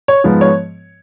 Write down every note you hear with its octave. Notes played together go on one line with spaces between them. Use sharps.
C#5
G#2 F3 G#3 B3
C#5